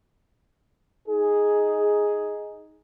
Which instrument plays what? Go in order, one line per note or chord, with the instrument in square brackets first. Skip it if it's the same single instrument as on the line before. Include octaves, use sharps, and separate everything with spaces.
[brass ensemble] D#4 G#4